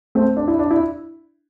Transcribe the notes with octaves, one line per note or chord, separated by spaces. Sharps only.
A3 C4
D4
E4
D4
E4